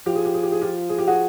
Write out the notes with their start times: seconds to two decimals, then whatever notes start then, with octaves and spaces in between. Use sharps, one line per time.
0.06 F3 G4
0.15 G#4
0.25 G4
0.34 G#4
0.43 G4
0.52 G#4
0.61 F4 G4
0.89 G#4
0.98 G4
1.08 F#4 G#4